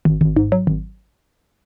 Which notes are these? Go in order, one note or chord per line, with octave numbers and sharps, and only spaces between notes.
G#1
G#1
G#2
F#3
G#1